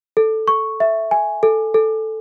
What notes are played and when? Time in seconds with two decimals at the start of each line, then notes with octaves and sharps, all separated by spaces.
0.17 A4
0.48 C#6
0.80 E5
1.11 G#5
1.43 A4
1.74 A4